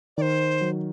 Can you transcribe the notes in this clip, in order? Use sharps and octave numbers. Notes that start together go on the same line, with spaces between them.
D#3 C5 D5
F#3